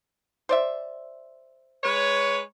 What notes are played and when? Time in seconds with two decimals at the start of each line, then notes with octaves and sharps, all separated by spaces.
0.49 C5 D5 E5
1.83 G#3 B4 C#5